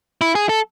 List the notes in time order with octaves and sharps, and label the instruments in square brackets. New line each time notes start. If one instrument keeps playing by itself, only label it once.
[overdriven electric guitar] E4
G#4
A4